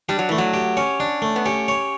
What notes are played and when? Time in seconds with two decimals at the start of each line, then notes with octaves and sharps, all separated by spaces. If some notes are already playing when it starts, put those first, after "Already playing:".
0.09 G3 D4
0.19 F#3
0.29 E3 A3
0.38 F#3
0.54 G4
0.77 C#4 C#5
1.00 D4
1.22 A3
1.36 B3
1.45 C#4 G4
1.68 C#5